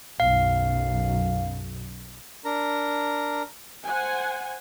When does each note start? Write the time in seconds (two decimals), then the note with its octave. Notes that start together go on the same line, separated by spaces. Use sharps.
0.20 B1 F#2 F5
2.45 D4 A#4 A#5
3.85 C5 F#5 G#5